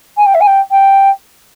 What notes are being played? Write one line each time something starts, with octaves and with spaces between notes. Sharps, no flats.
G#5
G5
E5
G#5
G5
G5